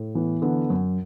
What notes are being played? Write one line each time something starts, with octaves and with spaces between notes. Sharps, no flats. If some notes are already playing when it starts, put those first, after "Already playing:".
Already playing: A2
E3 B3
D3 B3
F#2